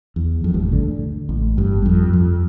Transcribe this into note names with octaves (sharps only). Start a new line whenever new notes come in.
E2
F2
G1 G2
A1 A2
D2 D3
A1 A2
G1 G2
F2
F2